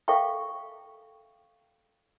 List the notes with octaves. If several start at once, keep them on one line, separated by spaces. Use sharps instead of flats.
A4 E5 F5 G5 C#6